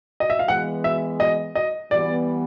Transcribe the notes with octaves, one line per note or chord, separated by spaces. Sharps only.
D#5
E5
F5
E3 G#3 B3 F#5
E5
D#5
D#5
E3 G3 B3 D5